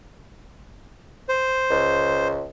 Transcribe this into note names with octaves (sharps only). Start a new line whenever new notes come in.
C5
C#2